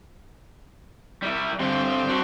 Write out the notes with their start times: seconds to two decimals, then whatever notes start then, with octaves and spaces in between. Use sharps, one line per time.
1.23 G3 E4
1.60 G2 D3 G3 C4
2.09 F#3 D4